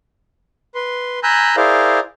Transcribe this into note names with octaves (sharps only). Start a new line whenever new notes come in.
B4 C6
G#5 A#5 B5 E6 F#6 G6
E4 G#4 A#4 C5 D5 F5